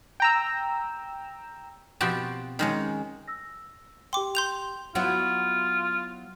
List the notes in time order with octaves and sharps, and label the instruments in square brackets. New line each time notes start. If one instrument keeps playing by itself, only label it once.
[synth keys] G5 A#5 E6
[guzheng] B2 F3 C4 F#4 G4 A5
D#3 G#3 C#4
[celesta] E6 A#6
[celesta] G4 G5 [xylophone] C6 D6
[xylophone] C6 G6 F7
[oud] F#3 B3 E4 [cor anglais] F4